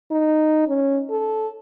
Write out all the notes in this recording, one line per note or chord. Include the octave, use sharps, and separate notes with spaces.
D#4
C#4
A4